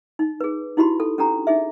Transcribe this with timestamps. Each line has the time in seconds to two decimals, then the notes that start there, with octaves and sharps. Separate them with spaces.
0.19 D#4
0.41 G#4 B4
0.77 D#4 E4 F#4 G4 B5 C6
1.00 A4
1.18 C#4 D4 G4 A4 A#5
1.47 D#4 G#4 E5